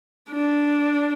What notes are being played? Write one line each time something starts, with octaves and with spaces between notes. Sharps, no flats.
D4